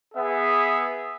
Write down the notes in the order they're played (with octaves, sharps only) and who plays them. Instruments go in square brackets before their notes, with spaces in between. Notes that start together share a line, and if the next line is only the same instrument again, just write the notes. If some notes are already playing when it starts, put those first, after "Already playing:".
[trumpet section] B3 G#4 E5